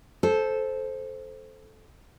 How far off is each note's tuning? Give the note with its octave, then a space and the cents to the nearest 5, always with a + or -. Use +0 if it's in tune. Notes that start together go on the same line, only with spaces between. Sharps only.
A4 -15 C5 +0